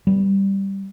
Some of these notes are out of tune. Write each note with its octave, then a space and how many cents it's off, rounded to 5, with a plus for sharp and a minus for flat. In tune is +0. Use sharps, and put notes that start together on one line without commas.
G3 +0 B3 +0